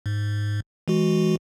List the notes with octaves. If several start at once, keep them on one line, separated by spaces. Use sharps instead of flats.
G#2
E3 G#3 F#4